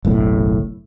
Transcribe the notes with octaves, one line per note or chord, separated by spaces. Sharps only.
F#1 B1 A2